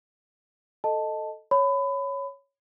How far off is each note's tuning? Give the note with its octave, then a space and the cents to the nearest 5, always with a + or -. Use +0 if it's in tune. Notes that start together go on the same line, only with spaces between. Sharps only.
A4 +0 D#5 +0 A5 +0
C#5 +0 B5 +25